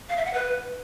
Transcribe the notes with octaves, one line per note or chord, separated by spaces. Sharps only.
F5
E5
F#5
B4